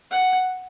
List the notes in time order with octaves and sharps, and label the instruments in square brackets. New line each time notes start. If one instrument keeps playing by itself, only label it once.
[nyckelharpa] F#5